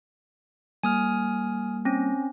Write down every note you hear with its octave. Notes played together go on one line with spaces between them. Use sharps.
G3 A#3 G#5 D#6 F6
C4 C#4